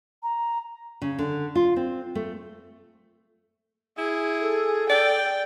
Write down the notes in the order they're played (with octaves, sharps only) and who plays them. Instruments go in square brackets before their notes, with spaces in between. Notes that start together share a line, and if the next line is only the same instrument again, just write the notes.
[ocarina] A#5
[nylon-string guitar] C#3
D3
F4
C4
A3
[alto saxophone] E4 [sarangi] G#4
[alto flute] A4
[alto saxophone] D5 [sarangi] G5